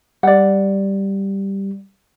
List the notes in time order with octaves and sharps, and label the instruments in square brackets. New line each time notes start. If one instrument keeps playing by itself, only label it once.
[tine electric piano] G3 [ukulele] D5 F#5